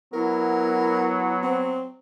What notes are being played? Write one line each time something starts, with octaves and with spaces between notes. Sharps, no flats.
F#3 B3 E4 A#4
C4